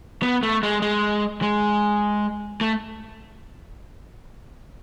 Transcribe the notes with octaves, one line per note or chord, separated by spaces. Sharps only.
B3
A3
G#3
G#3
G#3
A3